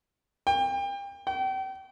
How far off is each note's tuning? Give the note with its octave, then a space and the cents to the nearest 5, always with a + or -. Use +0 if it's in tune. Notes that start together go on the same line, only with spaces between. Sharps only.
G5 +30
G5 -35